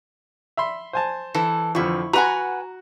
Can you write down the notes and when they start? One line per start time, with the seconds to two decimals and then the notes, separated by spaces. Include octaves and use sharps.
0.57 E5 B5 C6
0.93 C5 G#5 A5
1.34 E3 A4
1.75 F2 D3 F3 E4 C#6
2.13 F#4 B4 F#5 G#5 A#5